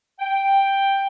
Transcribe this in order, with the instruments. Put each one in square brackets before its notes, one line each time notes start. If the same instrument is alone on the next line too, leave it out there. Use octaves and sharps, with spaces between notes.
[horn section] G5